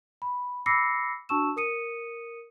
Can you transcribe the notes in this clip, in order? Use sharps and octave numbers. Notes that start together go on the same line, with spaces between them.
B5
B5 D6 E6 A#6 C7 C#7
D4 F#4 A5 C#6 E6 E7
A#4 D#6 C#7 D#7